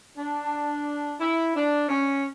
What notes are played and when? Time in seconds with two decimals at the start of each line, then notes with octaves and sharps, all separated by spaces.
0.17 D4
1.21 E4
1.55 D4
1.89 C#4